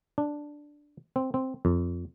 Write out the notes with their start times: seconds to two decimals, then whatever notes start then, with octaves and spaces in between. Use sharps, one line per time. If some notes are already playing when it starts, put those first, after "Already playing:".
0.18 D4
1.16 C4
1.34 C4
1.65 F2